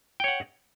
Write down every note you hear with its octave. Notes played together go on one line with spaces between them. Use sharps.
C#5 F#5 G5